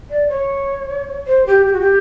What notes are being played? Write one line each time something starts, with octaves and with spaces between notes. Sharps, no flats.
D5
C#5
C5
G4
G4
F#4
G4